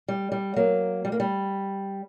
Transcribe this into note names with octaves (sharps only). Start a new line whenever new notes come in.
G3
G3
F#3 A#3
G3
A#3
G3